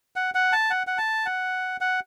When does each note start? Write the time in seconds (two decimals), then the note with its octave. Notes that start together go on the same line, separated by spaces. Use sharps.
0.16 F#5
0.35 F#5
0.52 A5
0.70 F#5
0.87 F#5
0.98 A5
1.26 F#5
1.81 F#5